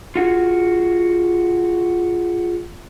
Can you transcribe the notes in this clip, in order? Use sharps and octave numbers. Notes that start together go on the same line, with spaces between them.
F4 F#4 G#4